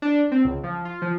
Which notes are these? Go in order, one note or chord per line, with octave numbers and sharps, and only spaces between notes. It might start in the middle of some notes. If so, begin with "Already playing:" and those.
D4
C4
C#2
F3
F4
F3